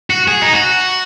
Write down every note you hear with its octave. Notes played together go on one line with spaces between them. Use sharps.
F#4
G#4
D#4
F#4